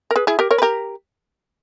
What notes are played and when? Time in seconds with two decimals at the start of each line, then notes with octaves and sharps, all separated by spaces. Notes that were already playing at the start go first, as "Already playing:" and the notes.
0.11 A#4
0.16 G#4 B4
0.27 E4 G#4
0.39 G4 A#4
0.51 A#4 C#5
0.58 B4
0.62 G4 A#4